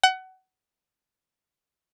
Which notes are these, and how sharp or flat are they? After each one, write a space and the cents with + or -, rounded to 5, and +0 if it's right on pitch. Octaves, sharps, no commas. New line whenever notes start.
F#5 +25